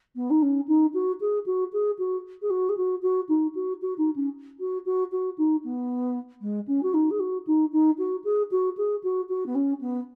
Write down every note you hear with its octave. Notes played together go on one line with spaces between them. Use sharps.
B3
D#4
C#4
D#4
F#4
G#4
F#4
G#4
F#4
G#4
F#4
G#4
F#4
F#4
D#4
F#4
F#4
D#4
C#4
F#4
F#4
F#4
D#4
B3
G#3
C#4
F#4
D#4
G#4
F#4
D#4
D#4
F#4
G#4
F#4
G#4
F#4
F#4
B3
C#4
B3